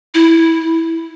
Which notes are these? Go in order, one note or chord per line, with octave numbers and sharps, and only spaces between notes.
E4